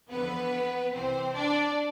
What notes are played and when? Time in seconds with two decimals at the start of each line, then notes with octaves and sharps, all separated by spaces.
0.10 E2 D3 F3 B3 B4
0.93 C2 C3 E3 C4 C5
1.34 D4 D5